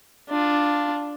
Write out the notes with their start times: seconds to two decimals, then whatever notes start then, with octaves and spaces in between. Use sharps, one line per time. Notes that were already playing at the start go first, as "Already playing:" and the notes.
0.30 D4 F4